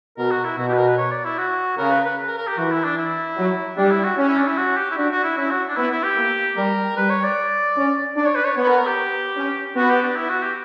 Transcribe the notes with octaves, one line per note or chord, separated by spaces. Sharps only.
B2 A#4
F#4
E4
B2 F#4
G4
B4
A#4
B4
C#5
D5
E4
F#4
C#3 A#4
B4
B4
A#4
A#4
G4
E3 F#4
E4
D4
E4
F#3
G3 D4
E4
F#4
C#4
E4
D4
E4
F#4
G4
E4
D4 F#4
F#4
E4
C#4 E4
F#4
D4
B3 E4
E4
G4
A#3
G3 A#4
G3 B4
C#5
D5
C#4
D4 D5
C#5
B4
C#5
B3 C#5
A#4
A#4
G4
C#4
B3 F#4
G4
D4
E4
F#4
G4